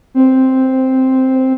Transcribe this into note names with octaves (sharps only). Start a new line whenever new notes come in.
C4